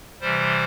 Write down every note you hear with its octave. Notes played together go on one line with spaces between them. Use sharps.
C3 E3 G3 C5